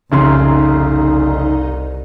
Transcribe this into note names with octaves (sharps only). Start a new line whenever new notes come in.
F1 C2 C#3 D#4 C6